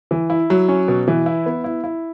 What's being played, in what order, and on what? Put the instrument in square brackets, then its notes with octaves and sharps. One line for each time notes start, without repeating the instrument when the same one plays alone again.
[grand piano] E3
E4
F#3
C#4
B2
E3
E4
B3
E4
E4